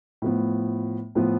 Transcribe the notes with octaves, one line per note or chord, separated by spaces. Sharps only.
A2 F3 B3
A2 F3 B3